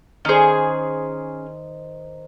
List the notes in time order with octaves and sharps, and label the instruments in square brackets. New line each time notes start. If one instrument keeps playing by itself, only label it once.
[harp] D#3 C5 [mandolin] C#4 G#4